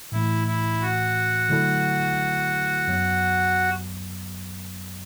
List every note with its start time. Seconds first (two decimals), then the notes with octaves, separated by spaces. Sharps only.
0.12 A2 E3 A3 E4
0.47 E4
0.81 F#4
1.49 D3 F#3 A3 E4 A4
2.87 F#2 F#3 B3